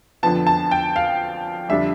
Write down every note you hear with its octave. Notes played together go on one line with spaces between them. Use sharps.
F2 D3 F3 B3 A5
A5
G5
F5
F2 D3 G3 D4 E5